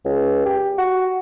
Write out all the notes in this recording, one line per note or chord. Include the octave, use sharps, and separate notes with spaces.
C#2
G4
F#4